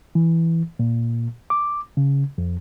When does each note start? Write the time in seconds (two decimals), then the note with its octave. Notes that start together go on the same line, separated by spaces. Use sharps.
0.15 E3
0.79 A#2
1.50 D6
1.97 C#3
2.38 F2